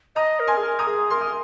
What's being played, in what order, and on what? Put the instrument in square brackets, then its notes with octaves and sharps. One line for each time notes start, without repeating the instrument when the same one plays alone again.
[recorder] D#5 [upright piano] A#5 D#6
[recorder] A#4
[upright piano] G#5 C6
[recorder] G#4
A#4
[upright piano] A#5 D#6
[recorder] G#4
[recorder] A#4 [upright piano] C6
[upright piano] D#6